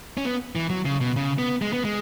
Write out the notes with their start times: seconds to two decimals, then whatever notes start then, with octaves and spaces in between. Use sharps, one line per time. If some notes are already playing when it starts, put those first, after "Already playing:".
0.17 C#4
0.25 B3
0.55 E3
0.70 F#3
0.85 C#3
1.01 B2
1.16 C#3
1.39 B3
1.62 G#3
1.73 B3
1.85 G#3